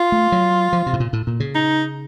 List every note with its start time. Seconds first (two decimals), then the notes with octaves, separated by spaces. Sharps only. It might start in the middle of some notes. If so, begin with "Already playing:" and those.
Already playing: F4
0.12 A3
0.32 F#3
0.73 F3
0.86 C3
0.93 A2
1.00 A#2
1.13 A2
1.27 A#2
1.40 C#3
1.55 D#4